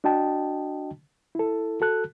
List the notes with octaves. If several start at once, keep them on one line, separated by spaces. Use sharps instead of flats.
D4 F#4 D#5 G5 A5
E4 A4
F#4 A4 F#6